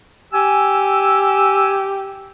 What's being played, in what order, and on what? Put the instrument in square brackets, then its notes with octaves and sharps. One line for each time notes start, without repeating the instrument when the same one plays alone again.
[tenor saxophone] G4 [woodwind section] G#5 E6